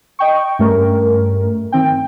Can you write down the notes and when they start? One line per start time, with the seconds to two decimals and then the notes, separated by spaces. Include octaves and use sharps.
0.19 D#5 G5 C#6
0.59 G2 A3 C#4 A#4
1.72 D#3 C4 G5